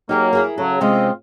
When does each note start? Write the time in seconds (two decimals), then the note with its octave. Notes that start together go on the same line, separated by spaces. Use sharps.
0.09 F#3 A#3 D#4 G4 G#4
0.33 E4 G#4 A#4
0.58 C#3 F#3 A4
0.81 C3 G#3 C4 C#4 F4 D#5